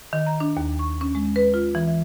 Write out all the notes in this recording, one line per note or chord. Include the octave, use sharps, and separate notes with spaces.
D#3
A#5
D4
D#2
C#6
C#4
G#3
B4
F4
E3
E5